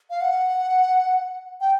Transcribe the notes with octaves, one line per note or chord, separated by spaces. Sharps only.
F5
F#5
G5